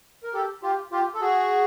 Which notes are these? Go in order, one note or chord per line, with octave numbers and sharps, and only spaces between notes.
A#4
G4 A4
F4 G4
F4 G4
A4
F#4 G#4